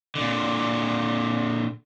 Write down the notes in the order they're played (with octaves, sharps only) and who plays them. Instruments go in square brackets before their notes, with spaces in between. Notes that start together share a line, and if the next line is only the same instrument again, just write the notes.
[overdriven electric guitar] A#2 D3